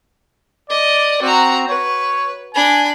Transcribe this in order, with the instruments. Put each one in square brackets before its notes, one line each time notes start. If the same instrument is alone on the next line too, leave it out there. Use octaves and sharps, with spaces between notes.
[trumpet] D5 [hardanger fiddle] D#5
[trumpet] C4 [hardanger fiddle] F#4 A#5
[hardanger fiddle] B4 [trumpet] C#5
[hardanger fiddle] D4 B5 [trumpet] G#5